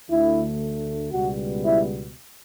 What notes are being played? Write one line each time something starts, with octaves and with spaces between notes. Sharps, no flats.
D2 D3 A3 E4
C#2 B2 G3 B3 F#4
E4